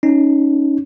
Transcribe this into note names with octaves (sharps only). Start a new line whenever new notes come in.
C#4 D#4